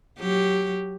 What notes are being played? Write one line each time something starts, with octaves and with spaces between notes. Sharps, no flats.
F#3 G4